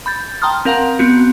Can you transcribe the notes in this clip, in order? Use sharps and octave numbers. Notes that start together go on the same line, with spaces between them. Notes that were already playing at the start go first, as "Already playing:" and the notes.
B5 G6 A6
G5 A5 A#5 C6 D#6 F6
C4 A#4 F5 F#5 A#5 C6
B3 C4 F#4